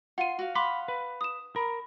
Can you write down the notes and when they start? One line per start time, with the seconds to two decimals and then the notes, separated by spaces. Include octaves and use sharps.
0.18 F4 F#5 C6 D#7
0.39 F#4 F5
0.55 F5 F#5 B5 C6 D6
0.88 B4
1.21 D#6 E7
1.56 A#4 B5